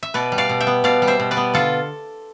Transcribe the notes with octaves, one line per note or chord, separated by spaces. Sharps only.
E5
B2 B4 D5
G3
D5 F5
B2
E5 G5
B3
B2 D5 F5
G3
C5 E5
B2
B4 D5
B3
D3 F4 A4